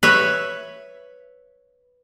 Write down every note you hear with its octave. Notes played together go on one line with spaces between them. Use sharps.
B4 C#5 E5